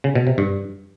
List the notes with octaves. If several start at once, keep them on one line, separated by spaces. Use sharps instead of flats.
C#3
B2
C3
G2